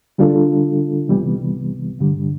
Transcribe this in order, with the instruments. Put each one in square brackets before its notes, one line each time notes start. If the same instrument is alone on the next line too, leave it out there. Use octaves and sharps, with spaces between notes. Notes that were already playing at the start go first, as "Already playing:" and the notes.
[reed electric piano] D3 G3 D4 F4 A4
C2 C3 E3 G3 B3
G2 D3 G3